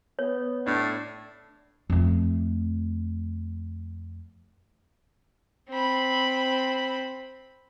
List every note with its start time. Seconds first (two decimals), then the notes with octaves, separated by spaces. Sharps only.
0.19 B3 C#5
0.67 A2 D4
1.90 F2 A3
5.70 C4 B5